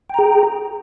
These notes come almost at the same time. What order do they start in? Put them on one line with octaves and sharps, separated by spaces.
G5 A#5 G#4